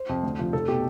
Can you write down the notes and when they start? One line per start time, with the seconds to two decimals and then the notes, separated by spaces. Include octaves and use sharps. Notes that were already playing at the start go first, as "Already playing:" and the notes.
Already playing: C5
0.09 F2 C3
0.23 D2
0.39 C3 F3
0.53 F1 A4
0.68 B2 G4